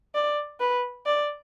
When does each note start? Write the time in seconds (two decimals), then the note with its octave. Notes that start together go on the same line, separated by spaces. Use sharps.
0.15 D5
0.60 B4
1.06 D5